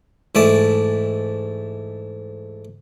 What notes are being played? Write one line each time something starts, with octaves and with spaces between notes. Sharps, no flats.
G#2 E3 A3 D5 A5